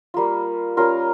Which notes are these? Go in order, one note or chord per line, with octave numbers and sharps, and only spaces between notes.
G3 A#3 F4
G3 C#4 F4 A#4